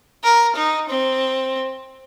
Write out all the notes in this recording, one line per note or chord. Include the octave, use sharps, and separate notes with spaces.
A#4
D#4
C4